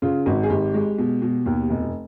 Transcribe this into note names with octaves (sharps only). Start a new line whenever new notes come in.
C#3 F4
G#1 F#4
G#4
G#1 G4
G#3
B2
B2
D#2
F1